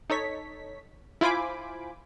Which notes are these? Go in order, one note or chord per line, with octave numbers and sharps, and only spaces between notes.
D#4 A4 C#5 B6
E4 F4 C5 G#5 B5 D6